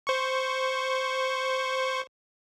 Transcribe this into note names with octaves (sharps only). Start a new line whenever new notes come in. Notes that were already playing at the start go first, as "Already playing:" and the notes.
C5 C#6